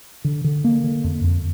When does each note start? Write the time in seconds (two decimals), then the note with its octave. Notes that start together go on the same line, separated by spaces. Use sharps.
0.24 D3
0.44 D3
0.64 A#3
0.84 D3
1.04 F2
1.24 F2